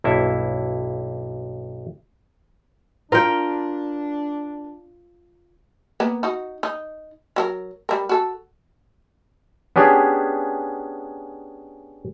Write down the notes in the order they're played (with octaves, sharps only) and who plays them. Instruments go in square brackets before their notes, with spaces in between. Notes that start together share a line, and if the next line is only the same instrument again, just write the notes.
[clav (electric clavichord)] B1 G2 A#3 E4 A4 E5
[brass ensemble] D4 [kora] F4 G5 [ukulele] A#4
[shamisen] A#3 B3
D#4 F#4
D#4
F#3 F#4 A#4
G3 A#4
F#4 A4
[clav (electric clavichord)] B3 C#4 D4 G4 G#4